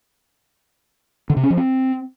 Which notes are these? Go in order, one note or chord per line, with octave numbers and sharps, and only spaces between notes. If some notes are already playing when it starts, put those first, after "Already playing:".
D3
C3
C#4
F3
C4